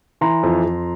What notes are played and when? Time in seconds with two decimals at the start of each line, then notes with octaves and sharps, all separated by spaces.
0.21 E3 A#5 C6
0.43 F2
0.64 F2